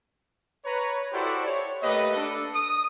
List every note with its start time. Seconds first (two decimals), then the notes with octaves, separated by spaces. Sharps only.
0.65 B4 C#5 A#5
1.12 E4 F#4 G4 A4 C5 D5
1.46 C#5
1.82 A3 A#3 G4 B4 D#5
2.15 D4 A4
2.53 D#6